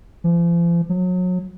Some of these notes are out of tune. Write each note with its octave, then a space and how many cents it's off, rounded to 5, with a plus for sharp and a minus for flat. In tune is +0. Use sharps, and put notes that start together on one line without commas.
F3 -40
F#3 -30